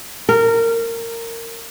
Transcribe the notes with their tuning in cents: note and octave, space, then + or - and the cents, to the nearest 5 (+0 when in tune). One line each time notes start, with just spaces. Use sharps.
A#4 -20